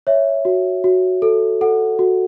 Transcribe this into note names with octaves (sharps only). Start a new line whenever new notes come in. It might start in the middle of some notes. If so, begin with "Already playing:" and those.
C#5 E5
F#4
F#4
A4
A4 F#5
F#4